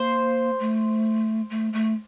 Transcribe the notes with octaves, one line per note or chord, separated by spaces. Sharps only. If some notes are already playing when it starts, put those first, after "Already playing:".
Already playing: A#3 C5
A3
A3
A3